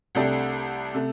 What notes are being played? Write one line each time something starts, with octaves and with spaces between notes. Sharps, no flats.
C2 C3 A3 D4 G4
C3 A3